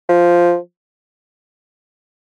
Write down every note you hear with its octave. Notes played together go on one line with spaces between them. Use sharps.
F3